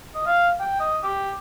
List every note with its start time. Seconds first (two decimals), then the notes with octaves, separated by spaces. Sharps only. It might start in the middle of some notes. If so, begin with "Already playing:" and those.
0.15 D#5
0.26 F5
0.60 G5
0.80 D#5
1.03 G4